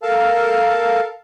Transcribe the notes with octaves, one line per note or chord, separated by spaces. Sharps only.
A4 A#4 F5 A5